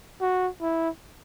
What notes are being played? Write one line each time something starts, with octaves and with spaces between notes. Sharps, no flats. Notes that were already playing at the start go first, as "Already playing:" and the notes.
F#4
E4